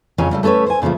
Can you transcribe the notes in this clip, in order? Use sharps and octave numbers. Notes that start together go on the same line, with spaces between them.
F2 C#3 F#3 C#4 G#5
C#3 G3 A3
A3 C#4 A4 B4 C#5
C5 G#5
A#2 C#3 E3 F3 A3